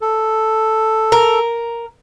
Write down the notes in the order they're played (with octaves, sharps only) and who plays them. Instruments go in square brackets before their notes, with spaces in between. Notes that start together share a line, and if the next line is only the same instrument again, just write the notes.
[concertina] A4
[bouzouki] A#4